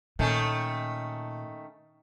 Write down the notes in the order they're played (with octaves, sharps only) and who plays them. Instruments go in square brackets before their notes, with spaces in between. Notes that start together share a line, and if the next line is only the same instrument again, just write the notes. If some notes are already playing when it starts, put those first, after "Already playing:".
[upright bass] A#2 [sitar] D#3 A3 C#4